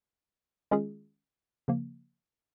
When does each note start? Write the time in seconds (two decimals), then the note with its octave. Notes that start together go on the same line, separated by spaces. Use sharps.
0.71 D#3 G#3 C#4 F4 G#4
1.68 C#3 F3 A#3